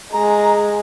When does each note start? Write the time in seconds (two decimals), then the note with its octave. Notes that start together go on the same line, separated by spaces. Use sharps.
0.13 G#3 A#5